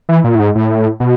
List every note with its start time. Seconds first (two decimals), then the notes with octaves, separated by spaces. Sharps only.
0.09 E3
0.24 A#2
0.35 A2
0.40 G#2
0.55 A2
1.00 B2